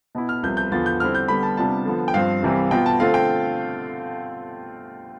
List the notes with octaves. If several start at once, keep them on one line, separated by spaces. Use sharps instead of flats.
B2 B3 E4
F6
C2 C3 F3 B3 G6
G6
E2 D3 F3 B3 F4 A6
G6
D3 G3 C4 E4 F6
G6
D3 G3 B3 B5
A5
C3 G3 B3 D4 F4 A5
D3 F3 B3
G5
G2 F3 C4 F5
C2 C3 E3 G3 C4
B2 B3 F4 G5
A5
D3 A3 C4 F4 F5
G5